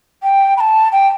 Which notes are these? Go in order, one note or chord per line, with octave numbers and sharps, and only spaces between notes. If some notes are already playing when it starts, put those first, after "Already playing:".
G5
B5
A5
G5